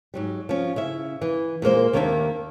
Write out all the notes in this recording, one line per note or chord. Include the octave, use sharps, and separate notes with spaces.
G#2 F#3 G3
F3 C#4
C#3 E4 E5
E3
A#2 G#3 A#3 C5
D#2 D#3 A#3 D4 C#5 E5